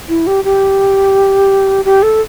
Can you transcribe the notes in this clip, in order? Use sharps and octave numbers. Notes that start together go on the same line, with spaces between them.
E4
G4
G4
G4
A4